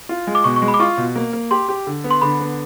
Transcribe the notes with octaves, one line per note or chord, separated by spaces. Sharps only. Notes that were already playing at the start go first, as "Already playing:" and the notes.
F4
G#3
D6
B2 C#6
C#6
G#3
B5
D6
F4 C#6
B2
A#3
A#3
G4 C6
G4
D3
B3
C6
D3 B5
B3